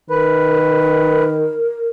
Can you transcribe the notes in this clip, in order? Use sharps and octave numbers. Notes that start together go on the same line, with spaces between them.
D#3 A#4 B4